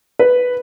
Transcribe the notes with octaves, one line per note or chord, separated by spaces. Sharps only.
B4